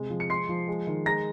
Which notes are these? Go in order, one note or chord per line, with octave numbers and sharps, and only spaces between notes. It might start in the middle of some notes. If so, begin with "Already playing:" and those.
Already playing: C3 G#3
F3
C#7
G#3 C6 C7
F3
G#3
D#3
G#3 A#5 A#6